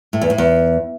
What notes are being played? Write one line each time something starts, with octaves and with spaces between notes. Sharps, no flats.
A2
E2
A2
E2